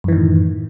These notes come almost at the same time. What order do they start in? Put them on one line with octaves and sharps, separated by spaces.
F#2 E3 D#3 A2